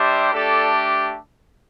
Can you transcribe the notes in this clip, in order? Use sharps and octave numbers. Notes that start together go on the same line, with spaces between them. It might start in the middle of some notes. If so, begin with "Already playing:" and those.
Already playing: G3 D4 G4 C5 E5
A3 D4 G4 A4 D5